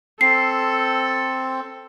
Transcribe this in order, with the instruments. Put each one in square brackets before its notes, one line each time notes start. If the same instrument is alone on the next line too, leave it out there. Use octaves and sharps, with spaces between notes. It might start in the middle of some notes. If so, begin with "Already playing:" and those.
[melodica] C4 [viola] A4 [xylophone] C7